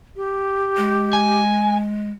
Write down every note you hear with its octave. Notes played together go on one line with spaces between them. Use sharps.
G4
G#3
G#5